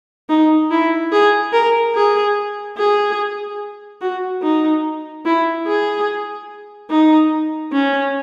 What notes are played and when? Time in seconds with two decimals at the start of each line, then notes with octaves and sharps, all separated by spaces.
0.29 D#4
0.71 E4
1.12 G#4
1.53 A#4
1.95 G#4
2.77 G#4
4.01 F#4
4.42 D#4
5.25 E4
5.67 G#4
6.90 D#4
7.73 C#4